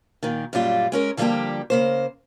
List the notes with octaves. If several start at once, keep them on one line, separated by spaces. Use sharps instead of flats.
A#2 D#3
F#2 A#2 G3 F4
G#3 C#4 A#4
D3 F3 G3 G#3 A#3 G4
C#3 A#3 C5